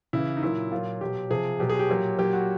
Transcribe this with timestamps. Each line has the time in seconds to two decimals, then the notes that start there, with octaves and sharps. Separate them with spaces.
0.13 C#3 E3 E4
0.37 D#4
0.43 A#2 F#3 E4
0.71 A#2 F#3 F4
1.01 B2 F#3 G4
1.30 C3 F3 G#4
1.59 B2 F#3 G4
1.70 G#4
1.79 G4
1.89 A#2 F#3
2.19 A#2 F#3 G4
2.33 F#4